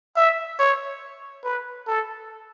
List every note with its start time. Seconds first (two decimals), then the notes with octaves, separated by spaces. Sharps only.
0.16 E5
0.59 C#5
1.44 B4
1.87 A4